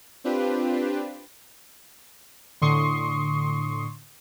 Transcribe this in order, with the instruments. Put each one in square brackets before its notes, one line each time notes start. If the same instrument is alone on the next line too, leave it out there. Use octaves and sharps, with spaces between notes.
[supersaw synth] C4 D4 F4 G4 B4
[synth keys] A2 D3 C6 C#6 D#6 C7